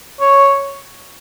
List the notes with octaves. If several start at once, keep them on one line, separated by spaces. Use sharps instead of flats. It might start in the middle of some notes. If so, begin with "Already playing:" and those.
C#5